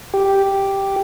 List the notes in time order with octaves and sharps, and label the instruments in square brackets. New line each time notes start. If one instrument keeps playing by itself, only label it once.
[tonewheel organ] G4